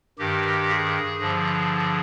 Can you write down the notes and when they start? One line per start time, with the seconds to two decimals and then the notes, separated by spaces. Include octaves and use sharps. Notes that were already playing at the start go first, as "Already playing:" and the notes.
0.19 G2 D#3 G4
0.69 G#4
1.20 G2 D3 F3